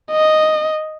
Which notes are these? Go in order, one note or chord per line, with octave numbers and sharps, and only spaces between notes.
D#5